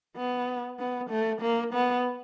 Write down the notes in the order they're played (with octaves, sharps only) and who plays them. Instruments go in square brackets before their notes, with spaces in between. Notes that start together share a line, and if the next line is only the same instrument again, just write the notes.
[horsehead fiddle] B3
B3
A3
A#3
B3